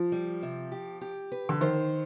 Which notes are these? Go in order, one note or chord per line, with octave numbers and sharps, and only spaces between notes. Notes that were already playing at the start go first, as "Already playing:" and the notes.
Already playing: F3
G3
C3
G4
G4
B4
D3
D#3 C5